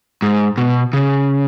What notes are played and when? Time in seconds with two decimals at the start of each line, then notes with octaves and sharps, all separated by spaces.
0.22 G#2
0.58 B2
0.93 C#3